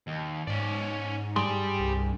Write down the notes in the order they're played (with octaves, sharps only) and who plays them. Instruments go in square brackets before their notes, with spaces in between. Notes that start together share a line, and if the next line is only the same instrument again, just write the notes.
[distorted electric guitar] D#2
[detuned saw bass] G#2 [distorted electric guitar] C#4 D5
[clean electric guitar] G2 G#4 C6 [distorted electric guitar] G4 D5
[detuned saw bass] C2